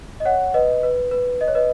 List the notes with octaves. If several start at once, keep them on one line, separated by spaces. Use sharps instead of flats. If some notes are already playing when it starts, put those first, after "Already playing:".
D#5
C#5 F#5
B4 D#5
B4
B4
D#5
C#5
B4 D#5